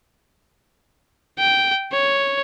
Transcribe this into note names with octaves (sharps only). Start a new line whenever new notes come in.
G5
C#5